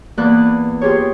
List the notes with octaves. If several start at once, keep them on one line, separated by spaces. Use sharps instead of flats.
E2 E3 A#3 B4 D5 F#6
F4 G4 G#4 C#5